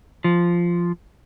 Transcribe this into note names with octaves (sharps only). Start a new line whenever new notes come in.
F3